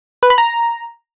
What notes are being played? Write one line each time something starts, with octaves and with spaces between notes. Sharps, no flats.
B4
B5
A#5